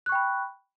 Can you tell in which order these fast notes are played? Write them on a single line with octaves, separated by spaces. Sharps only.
F#6 C#6 G5 B5